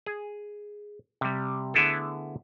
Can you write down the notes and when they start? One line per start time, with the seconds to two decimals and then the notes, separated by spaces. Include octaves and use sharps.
0.06 G#4
1.21 C3 G3
1.74 D3 A3 B3 E4 G#4 A4